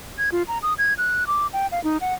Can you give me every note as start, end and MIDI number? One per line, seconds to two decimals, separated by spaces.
0.18 0.29 92
0.32 0.43 65
0.48 0.58 82
0.63 0.74 87
0.78 0.94 92
0.98 1.27 90
1.27 1.47 86
1.53 1.67 79
1.72 1.82 77
1.84 1.98 63
2.01 2.14 78